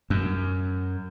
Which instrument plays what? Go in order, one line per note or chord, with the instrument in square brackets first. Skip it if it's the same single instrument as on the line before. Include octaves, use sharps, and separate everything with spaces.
[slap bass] F#2